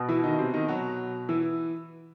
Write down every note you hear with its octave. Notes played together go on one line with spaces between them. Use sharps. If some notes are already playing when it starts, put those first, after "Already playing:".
Already playing: B2
E3 E4
D#3 D#4
C3 C4
D#3 D#4
F#3 F#4
E3 E4